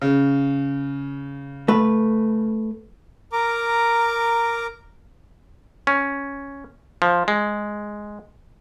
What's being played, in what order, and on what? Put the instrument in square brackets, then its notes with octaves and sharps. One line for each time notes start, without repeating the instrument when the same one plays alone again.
[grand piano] C#3
[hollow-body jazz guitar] A3 B4
[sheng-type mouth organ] A#4 A#5 D6
[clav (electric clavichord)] C#4
F3
G#3